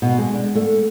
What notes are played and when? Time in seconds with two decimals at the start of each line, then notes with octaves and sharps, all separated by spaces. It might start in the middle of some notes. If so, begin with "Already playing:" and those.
0.02 B2
0.18 G#3
0.34 D4
0.55 A3